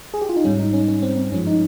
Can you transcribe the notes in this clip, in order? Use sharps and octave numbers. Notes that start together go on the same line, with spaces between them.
G#4
G4
F4
D#4
G#2 G3 C#4
D#4
C#4
C#4
C4
C4
G2 F3 G#3 C#4
D#4